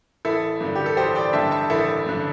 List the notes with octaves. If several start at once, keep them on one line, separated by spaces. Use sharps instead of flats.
A1 E4 A4
G2 D3
G4
A4
A1 G4 C5
D5 G5
G2 D3 E5 A5
E5 A5
A1 E4 A4
G2 D3